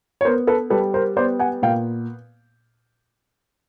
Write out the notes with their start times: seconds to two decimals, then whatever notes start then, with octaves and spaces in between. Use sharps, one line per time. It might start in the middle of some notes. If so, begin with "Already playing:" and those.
0.21 C#5
0.25 B3 A#4 C5
0.47 A4 B4
0.70 G3 A4 B4
0.94 A#4 C5
1.16 B3 C5 D5
1.39 F#5 G#5
1.62 A#2 F5 G5